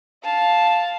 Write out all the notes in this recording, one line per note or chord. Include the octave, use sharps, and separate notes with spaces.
F5 A5